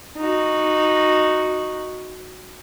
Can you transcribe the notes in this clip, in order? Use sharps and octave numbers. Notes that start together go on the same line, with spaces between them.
D#4 F#4